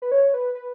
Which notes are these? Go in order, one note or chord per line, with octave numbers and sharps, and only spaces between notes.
B4
C#5
B4
B4